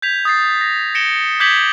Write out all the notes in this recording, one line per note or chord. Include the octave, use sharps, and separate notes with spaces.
G6 G#6 B6 F7
D#6 A6 C7
A#6
A#6 C#7 D7 E7 G7
D6 G6 G#6 B6 F#7 G7